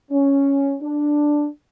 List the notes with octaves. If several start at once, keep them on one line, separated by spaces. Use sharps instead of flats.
C#4
D4